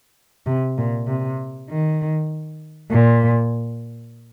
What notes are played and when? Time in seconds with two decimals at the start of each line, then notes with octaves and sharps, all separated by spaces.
0.46 C3
0.78 A#2
1.07 C3
1.70 D#3
2.91 A#2